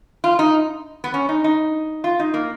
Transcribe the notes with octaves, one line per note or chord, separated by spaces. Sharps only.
F4
D#4
B3
C#4
D#4
D#4
F4
D#4
A#3